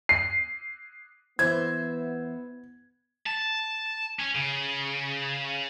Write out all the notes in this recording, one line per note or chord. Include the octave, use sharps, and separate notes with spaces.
C7
E3 B3 C5 E5 G#6
A5
C#4
C#3